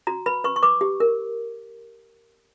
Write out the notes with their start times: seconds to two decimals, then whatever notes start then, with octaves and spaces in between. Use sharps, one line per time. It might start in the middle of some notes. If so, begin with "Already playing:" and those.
0.07 F#4 A#5
0.26 B4 B5
0.44 B4 C#6
0.56 C#6
0.63 B4 D6
0.81 G4
1.00 A#4